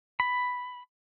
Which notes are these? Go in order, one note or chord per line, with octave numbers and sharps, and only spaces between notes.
B5